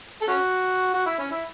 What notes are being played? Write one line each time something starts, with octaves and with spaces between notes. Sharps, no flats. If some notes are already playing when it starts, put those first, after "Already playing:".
A4
C#4 F#4
F#4
E4
C#4
E4